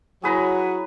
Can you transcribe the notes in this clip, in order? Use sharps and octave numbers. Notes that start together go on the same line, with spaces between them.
F#3 E4 F#4 G#4 B4 C#5 A#5 B5